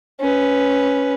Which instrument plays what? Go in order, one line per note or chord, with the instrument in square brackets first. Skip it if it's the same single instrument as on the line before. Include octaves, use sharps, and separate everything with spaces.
[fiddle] C#4 B4